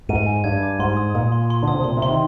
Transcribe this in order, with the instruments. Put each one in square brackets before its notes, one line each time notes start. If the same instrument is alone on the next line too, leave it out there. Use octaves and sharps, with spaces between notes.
[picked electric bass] G#2 [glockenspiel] D#7
[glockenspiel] G#5
[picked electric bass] G2 [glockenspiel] G#6
[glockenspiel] D6
[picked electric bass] G#2 [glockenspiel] C6
[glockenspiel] D#6
[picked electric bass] A#2 [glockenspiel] D#6
[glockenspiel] C6
C6
[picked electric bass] D3 [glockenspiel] D#6
[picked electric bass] C3
[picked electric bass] A#2 [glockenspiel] C6
[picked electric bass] C3
[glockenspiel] C6
[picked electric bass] D#3